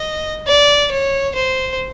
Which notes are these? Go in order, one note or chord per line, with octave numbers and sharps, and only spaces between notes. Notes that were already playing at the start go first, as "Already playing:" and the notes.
Already playing: D#5
D5
C#5
C5